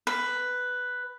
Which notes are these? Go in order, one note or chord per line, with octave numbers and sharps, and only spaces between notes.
B4